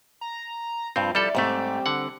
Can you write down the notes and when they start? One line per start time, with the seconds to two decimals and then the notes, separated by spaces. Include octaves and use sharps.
0.21 A#5
0.96 G2 F3 C4 F4
1.15 F3 G3 E4 A4 D5
1.35 G#2 G3 A3 C4 G4
1.86 D3 F#5